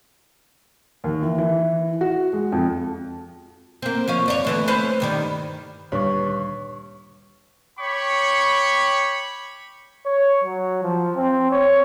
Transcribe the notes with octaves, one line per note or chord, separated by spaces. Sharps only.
D#2
E3
E3
F#4
G#3
F2
A#3 C4
F3 C#4 F5
F#2 D4 C#5
D2 E3 A3
C#4 B4 C5
G2 D#3 G3
D2 G2 A#2 D#3 C#5 C#6
C#5 G5 B5 C#6 D6
C#5
F#3
F3
C4
C#5